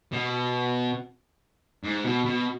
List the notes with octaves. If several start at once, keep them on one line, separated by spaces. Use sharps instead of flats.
B2
G#2
B2
B2